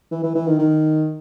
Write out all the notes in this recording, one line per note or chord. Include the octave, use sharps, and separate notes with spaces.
E3
E3
E3
D#3
D#3